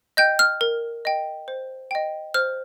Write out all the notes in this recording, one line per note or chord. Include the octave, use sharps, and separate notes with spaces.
D#5 G5 G6
F6
A#4
D#5 G5
C5
D#5 G5
C5 F6